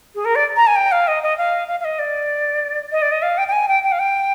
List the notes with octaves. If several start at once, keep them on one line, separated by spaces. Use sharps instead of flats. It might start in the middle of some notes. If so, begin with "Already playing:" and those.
G#4
A#4
D5
A#5
G#5
G5
F5
D#5
D#5
F5
F5
F5
D#5
D5
D#5
D5
D#5
F5
G5
G5
G#5
G5
G5
F5
G5